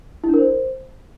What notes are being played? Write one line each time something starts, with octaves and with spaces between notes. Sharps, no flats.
E4
D4
A#4
C5